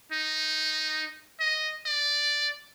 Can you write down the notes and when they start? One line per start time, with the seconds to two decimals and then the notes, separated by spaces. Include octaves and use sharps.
0.12 D#4
1.40 D#5
1.86 D5